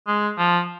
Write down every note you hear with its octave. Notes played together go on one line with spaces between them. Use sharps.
G#3
F3